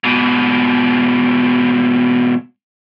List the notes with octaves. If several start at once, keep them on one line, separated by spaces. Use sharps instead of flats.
G#2 B2